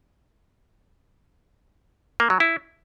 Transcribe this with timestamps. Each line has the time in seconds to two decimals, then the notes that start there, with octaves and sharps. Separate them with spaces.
2.20 A#3
2.30 F#3
2.40 E4